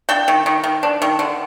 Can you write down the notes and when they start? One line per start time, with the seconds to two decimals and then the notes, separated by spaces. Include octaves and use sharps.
0.09 D4 G5
0.28 D#3
0.46 D#3
0.64 D#3
0.83 D4
1.02 D#3
1.19 D3